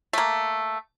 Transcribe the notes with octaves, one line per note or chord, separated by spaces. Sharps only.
A3 A#3